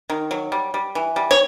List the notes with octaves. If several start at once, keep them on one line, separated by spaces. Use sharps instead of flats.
D#3
F#3
G3
G3
E3
G3
C#5